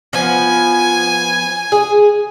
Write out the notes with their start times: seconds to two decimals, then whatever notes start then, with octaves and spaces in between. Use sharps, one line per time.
0.13 F3 B3 G#5
1.72 G#4